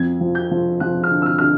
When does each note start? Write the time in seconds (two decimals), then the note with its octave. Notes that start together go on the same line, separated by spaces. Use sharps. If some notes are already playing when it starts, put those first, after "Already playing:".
Already playing: F2 G#6
0.21 F3
0.35 G6
0.51 F3
0.80 F3 F#6
1.04 F6
1.11 D3
1.22 E6
1.26 F6
1.39 D3 F6